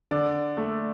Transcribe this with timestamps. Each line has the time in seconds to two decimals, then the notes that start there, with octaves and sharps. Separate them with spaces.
0.11 D3 D5
0.57 A3